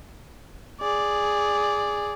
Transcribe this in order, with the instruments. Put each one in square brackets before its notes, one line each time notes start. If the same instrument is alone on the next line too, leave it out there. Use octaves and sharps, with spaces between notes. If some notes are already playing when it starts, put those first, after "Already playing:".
[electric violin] G#4 D5